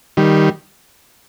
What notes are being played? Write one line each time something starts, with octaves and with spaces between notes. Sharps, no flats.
D#3 G3